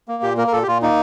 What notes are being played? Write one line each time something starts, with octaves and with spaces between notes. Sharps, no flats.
A#3
A#2 G4
A#3 A#4
A#4
A#2 A4
G4
A#2 F4
A#3 D#4